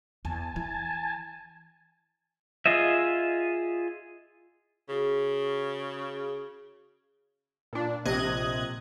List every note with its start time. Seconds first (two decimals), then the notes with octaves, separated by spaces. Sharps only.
0.25 E2 G#5 A5
0.56 E3
2.66 F4 G#4 D#5 E5
4.89 C#3 F#4 G#4
7.73 A#2 D4
8.05 A#1 C3 D#5 F#6 G#6